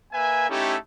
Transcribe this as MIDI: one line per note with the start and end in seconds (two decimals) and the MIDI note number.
0.13 0.47 58
0.13 0.47 71
0.13 0.47 76
0.13 0.47 80
0.49 0.77 57
0.49 0.77 61
0.49 0.77 63
0.49 0.77 64
0.49 0.77 67
0.49 0.77 69